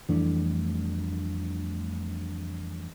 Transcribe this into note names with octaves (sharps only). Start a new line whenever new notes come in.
F2 E3 G3 A3 D4